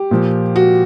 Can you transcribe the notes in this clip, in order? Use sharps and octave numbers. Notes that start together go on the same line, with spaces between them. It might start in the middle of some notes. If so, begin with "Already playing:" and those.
Already playing: G4
A#2 F3
F#4